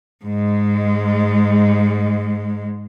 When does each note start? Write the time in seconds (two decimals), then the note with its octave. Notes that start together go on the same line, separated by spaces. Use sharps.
0.25 G#2 G#3